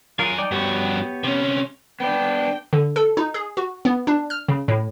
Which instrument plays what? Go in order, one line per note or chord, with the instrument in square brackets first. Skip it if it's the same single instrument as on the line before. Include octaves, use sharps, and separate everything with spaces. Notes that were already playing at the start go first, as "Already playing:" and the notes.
[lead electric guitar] F#3 G#5 [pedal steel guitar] F4 G#4 A#4
[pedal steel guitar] D#4 D5 G5
[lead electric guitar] G2 F#4 [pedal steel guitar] B3 G4 C#5
[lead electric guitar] C3 C#4
[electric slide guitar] B3 D4 [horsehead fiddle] G5
[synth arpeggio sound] D3
A4
D#4
G#4
F#4
B3
D4
F6
C#3
A2